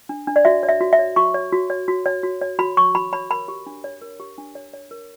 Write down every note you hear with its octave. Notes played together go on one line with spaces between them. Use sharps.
D4
D4
D5
F#4 E5
C#5
E5
F#4
E5
C#5
F#4 C#6
C#5
F#4
C#5
F#4
C#5
F#4
C#5
F#4 B5
C#5 C#6
F#4 B5
C#5 B5
A#4 B5
G4
D4
C#5
A#4
G4
D4
C#5
C#5
A#4